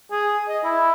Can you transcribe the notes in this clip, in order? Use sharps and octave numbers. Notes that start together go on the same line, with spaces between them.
G#4
D#5
E4